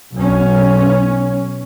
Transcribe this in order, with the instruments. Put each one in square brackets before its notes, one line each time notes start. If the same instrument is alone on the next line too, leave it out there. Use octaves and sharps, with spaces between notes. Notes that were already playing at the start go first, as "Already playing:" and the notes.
[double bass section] B1 C#4